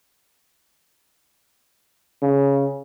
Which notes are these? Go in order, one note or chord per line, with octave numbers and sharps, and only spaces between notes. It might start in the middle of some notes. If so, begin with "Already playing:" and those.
C#3